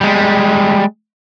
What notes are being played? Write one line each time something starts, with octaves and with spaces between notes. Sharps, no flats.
G3 G#3